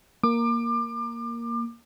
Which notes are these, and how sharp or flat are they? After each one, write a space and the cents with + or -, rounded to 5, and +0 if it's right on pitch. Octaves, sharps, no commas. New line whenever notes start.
A#3 +0 D6 +30